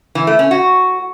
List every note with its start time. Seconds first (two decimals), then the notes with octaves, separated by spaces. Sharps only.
0.15 E3
0.27 A3
0.39 C#4
0.51 F#4